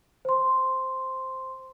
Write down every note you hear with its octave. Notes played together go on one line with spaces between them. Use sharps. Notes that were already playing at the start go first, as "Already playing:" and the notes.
C5 C6